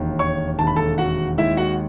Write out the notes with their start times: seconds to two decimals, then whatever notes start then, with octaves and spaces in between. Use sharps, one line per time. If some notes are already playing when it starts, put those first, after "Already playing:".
Already playing: E1 D#2 D#3
0.19 C#5 C#6
0.58 E1 D#2 D#3 A5
0.67 B5
0.76 A4 A5
0.98 F#4 F#5
1.38 D#2 D#3 G#3 E4 E5
1.57 F#4 F#5